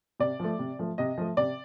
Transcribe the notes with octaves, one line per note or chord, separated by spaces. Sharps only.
C3 D5
F3 A3
C3
F3 A3
C3 D#5
F3 A3
C3 D5